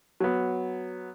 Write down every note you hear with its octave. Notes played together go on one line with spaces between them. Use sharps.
F#3 B3